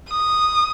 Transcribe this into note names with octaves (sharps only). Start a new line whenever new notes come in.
D#6